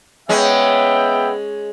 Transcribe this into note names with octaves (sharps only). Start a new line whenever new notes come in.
G#3 B3 C#4 E5 G5